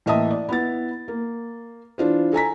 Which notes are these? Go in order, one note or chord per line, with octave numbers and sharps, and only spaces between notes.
A1 A#3 D#5 E5 A5 D#6
D5
B3 E4 A6
A#3
E3 D4 F4 C5
A4 G#5 A#5 B6